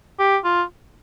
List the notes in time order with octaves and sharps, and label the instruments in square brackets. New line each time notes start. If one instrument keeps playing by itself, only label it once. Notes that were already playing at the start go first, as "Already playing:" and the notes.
[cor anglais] G4
F4